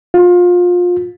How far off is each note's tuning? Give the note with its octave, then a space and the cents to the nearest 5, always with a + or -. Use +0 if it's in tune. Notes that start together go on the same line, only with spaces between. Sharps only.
F4 +25